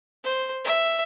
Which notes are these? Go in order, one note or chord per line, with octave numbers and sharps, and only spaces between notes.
C5
E5